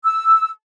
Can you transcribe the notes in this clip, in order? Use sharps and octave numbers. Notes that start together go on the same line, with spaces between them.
E6